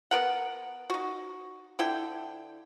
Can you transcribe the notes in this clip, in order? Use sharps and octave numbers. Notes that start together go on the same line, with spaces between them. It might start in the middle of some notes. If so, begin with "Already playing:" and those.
B3 A#4 F#5
D#4 F#4
D3 E4 G5